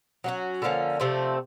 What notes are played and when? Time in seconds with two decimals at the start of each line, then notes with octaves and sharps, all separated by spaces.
0.24 F#3 A3 C#4 F#4
0.62 D3 F3 A#3 C#4
1.00 C3 F3 A3 C4